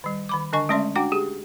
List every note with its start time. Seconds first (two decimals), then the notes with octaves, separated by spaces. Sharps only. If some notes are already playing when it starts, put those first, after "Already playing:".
0.04 D#3 G3
0.29 D#3 B5 D6
0.53 D3 D4 D#5 G#5 C#6
0.69 G#3 A3 C#4 D5 E5 C6
0.96 D4 F#4 F#5 G5 D6
1.12 G4 G#4